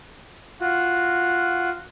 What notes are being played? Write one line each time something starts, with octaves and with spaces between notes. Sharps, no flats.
F4 F#4